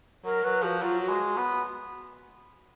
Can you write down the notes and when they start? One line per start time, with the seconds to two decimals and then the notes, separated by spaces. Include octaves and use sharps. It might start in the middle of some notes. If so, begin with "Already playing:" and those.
0.25 F#3 A#4
0.44 F#3 B4
0.62 F3 F#4
0.81 F#3 F4
1.00 F#4
1.09 G#3
1.37 B3